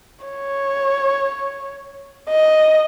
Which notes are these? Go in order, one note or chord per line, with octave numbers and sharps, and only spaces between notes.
C#5
D#5